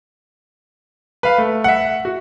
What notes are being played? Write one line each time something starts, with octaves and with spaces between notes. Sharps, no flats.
B4 F5
A3
E5 F#5
F#4